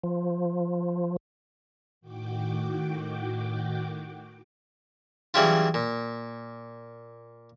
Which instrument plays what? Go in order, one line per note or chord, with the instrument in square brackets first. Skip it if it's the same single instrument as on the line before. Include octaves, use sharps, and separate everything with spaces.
[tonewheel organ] F3
[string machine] A2 D#3 F#4 G5 D6
[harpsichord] C#3 E3 F#3 G3 E4 F4
A#2